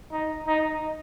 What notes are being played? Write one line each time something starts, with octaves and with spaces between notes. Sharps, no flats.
D#4
D#4